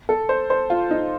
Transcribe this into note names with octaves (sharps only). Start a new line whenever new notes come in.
A4
C5
C5
F4
D#4